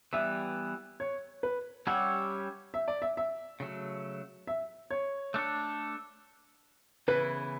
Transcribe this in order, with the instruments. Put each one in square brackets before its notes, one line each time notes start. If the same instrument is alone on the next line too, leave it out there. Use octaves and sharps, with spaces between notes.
[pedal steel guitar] E3 G3 B3 [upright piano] E5
[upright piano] C#5
B4
[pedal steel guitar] G3 C#4 G4 C#5 E5 [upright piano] F#5
[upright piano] E5
D5
E5
E5
[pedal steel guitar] C#3 F#3 A3
[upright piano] E5
C#5
[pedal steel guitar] A3 D4 A4
[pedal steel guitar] C#3 E3 B3 E4 [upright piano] B4